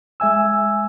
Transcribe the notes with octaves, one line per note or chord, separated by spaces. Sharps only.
G#3 E5 G#5 E6